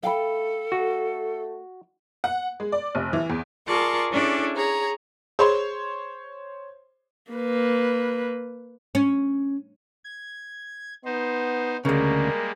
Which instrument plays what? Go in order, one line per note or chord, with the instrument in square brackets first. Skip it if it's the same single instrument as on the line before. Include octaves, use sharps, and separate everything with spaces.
[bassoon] A3 [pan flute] A4 [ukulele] F5 G5 B5
[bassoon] A3 [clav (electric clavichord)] F#4
[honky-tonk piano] F#5
G#3
D5
F1
E3
E2
[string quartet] F4 G#4 A#4 D5 A5 C#6
C#4 D4 E4 G#4 A4 D5
G#4 C#5 A#5
[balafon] G#4 B5 [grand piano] C5 C#5 C6
[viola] A#3 B4
[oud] C#4
[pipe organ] G#6
[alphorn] B3 [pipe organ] D#4 C5
[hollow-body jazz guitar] D2 C#3 [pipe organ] G3 G#3 A#3 [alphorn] A#4